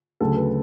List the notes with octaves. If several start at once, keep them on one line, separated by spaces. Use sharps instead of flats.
D2 C#3 F#3 A4
B4